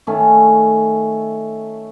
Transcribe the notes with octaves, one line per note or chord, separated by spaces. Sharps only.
D#3 A3 C#4